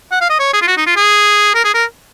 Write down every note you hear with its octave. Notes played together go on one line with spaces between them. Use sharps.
F#5
F5
D#5
C#5
G#4
F4
F#4
D#4
F4
G#4
A#4
G#4
A#4